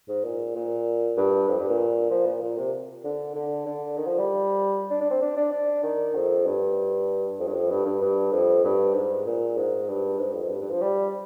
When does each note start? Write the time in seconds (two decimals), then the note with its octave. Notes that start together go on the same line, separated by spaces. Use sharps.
0.09 G#2
0.24 A#2
0.55 A#2
1.17 G2
1.49 F2
1.59 G2
1.69 A#2
2.11 F3
2.26 A#2
2.42 A#2
2.58 C3
3.04 D3
3.35 D3
3.66 D3
3.97 D#3
4.07 F3
4.18 G3
4.90 D4
5.01 D4
5.11 C4
5.21 D4
5.37 D4
5.52 D4
5.83 D#3
6.15 F2
6.46 G2
7.39 F2
7.47 G2
7.54 F2
7.70 G2
7.86 G2
8.02 G2
8.32 F2
8.64 G2
8.94 G#2
9.26 A#2
9.57 G#2
9.88 G2
10.19 G#2
10.30 G2
10.34 F2
10.50 G2
10.61 G2
10.71 F3
10.81 G3